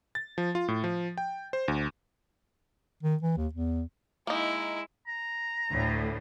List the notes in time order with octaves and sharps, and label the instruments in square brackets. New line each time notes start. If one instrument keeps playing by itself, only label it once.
[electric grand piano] A6
F3
F4
A2
F3
G5
C5
D2
[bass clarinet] D#3
E3
D#2
E2
[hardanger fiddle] G#3 E4 [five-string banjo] A#3 D#4
[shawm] A#5
[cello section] D2 A2